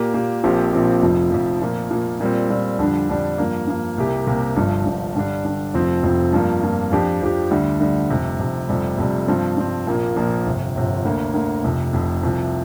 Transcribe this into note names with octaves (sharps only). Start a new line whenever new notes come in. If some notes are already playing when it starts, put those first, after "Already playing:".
Already playing: A#2 A#3 G4
A#2 A#3 G4
A#1 A#2 F3 C4 G4
A#1 A#2 F3 C4 G4
F1 F2 F3
F1 F2 F3
A#2 F3 A#3
A#2 F3 A#3
A#2 G3 C4
A#2 G3 C4
F2 D3 G3 D4
F2 D3 G3 D4
G2 F3 A#3
G2 F3 A#3
C2 C3 A#3 G4
C2 C3 A#3 G4
G1 G2 F3
G1 G2 F3
G2 D3 G3 D4
G2 D3 G3 D4
F1 F2 F3 C4
F1 F2 F3 C4
G2 F3 A#3
G2 F3 A#3
F2 F3 D4 G4
F2 F3 D4 G4
D2 D3 G3
D2 D3 G3
F1 F2 C3
F1 F2 C3
F1 F2 C3 G3
F1 F2 C3 G3
G2 F3 C4
G2 F3 C4
A#1 A#2 F3 A#3
A#1 A#2 F3 A#3
G1 F2 C3
G1 F2 C3
D2 D3 A#3
D2 D3 A#3
F1 F2 C3
F1 F2 C3
C2 C3 F3